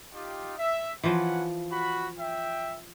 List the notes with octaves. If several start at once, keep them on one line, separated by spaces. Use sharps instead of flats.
D#4 F4 G4
E5
E3 F3 C#4 B4 F#5
F#4 B5
E5 G5